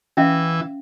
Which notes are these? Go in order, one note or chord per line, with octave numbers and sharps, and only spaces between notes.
E3 C#4 E5 F5